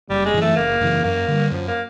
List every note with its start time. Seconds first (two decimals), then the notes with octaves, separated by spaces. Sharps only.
0.10 F#1 G3
0.25 G#3
0.33 F#2 C#3
0.37 E3 A3
0.57 F#1 A#3
0.81 F#2 C#3 E3
1.04 F#2 A#3
1.28 D3 G3
1.51 F#2 F3
1.68 A#3